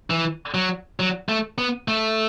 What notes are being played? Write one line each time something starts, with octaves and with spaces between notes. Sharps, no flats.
E3
F#3
F#3
A3
B3
A3